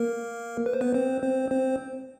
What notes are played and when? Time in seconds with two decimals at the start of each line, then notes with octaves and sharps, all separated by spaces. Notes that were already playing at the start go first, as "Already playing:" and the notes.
Already playing: A#3 A#4
0.66 B4
0.73 C5
0.81 B3 B4
0.94 C4 C5
1.22 C4 C5
1.51 C4 C5